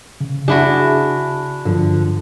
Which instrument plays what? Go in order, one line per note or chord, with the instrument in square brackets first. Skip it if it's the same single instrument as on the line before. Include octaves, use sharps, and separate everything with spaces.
[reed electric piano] C#3
[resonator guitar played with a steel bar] D4 E4 F#4 [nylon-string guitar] G#4
[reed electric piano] G2 [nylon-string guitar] D3 F3